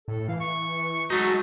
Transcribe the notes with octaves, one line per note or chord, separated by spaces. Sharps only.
A2 A4
E3 F5
C#6
F#3 G#3 A3 D#4 F#4